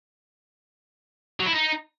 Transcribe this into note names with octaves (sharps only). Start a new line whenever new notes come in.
F#3
E4
D#4